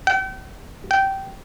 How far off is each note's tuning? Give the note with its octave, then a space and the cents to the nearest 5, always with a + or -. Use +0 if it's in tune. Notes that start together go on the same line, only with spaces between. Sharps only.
G5 -40
G5 -15